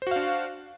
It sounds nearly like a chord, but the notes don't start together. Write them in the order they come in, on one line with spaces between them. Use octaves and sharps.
C5 F#4 F5 D4